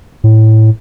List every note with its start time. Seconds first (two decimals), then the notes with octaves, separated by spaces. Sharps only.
0.24 A2